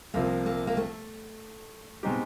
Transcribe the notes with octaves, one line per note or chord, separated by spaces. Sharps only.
C2 C3 F3 A#3
A#3
A#3
A3
B2 G#3 C4 D#4 G4